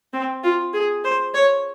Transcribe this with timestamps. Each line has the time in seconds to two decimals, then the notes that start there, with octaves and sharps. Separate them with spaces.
0.13 C4
0.43 F4
0.74 G#4
1.04 C5
1.34 C#5